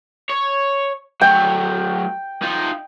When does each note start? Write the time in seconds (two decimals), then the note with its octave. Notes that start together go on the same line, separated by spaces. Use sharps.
0.29 C#5
1.21 F#3 A3 G5
2.42 D#4 F4